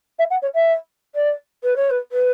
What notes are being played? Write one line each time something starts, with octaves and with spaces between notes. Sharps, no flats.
E5
F#5
C#5
E5
D5
B4
C#5
B4
B4